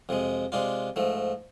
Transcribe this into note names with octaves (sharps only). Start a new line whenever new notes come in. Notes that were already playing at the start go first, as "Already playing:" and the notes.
F2 C3 G#3
C3 G#3 D4 F4
G#2 F3 A3